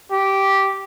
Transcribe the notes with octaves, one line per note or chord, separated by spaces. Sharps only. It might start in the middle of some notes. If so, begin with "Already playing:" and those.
G4